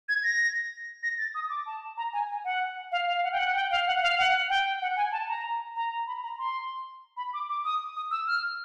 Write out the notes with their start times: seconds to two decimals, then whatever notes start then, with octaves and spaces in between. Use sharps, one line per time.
0.09 G#6
0.24 A#6
1.03 A#6
1.18 A6
1.35 D#6
1.50 D6
1.66 A5
1.97 A#5
2.13 G#5
2.29 G#5
2.45 F#5
2.92 F5
3.07 F5
3.23 F#5
3.32 G5
3.39 F#5
3.55 G5
3.71 F5
3.87 F#5
4.02 F5
4.18 F#5
4.50 G5
4.82 F#5
4.97 G#5
5.12 A5
5.28 A#5
5.75 A#5
6.07 B5
6.23 A#5
6.39 C6
7.17 B5
7.34 D6
7.49 D6
7.65 D#6
7.96 D#6
8.11 E6
8.27 F6